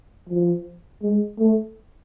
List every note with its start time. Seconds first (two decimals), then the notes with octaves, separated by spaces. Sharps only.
0.29 F3
1.03 G#3
1.39 A3